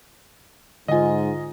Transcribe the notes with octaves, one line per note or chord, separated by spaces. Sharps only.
G#2 D3 F4 D#5 G#5